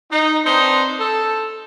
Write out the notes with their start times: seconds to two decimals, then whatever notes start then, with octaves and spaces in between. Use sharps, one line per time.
0.10 D#4
0.45 C4 D4 D#4 B4 C5
0.99 A4